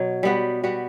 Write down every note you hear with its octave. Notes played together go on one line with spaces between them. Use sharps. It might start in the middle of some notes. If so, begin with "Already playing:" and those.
Already playing: B2 F#3
G3 B3 F#4
G3 B3 F#4